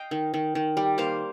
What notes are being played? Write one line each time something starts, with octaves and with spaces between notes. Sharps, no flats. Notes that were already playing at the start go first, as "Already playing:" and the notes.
Already playing: D#5 F5 G5
D#3
D#3
D#3
G3
A#3 C5 F5